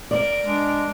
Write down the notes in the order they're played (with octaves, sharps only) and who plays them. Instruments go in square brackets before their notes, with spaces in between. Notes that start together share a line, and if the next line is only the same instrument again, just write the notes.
[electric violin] A#4 D7 [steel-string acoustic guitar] D5
[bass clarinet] G#3 [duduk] D4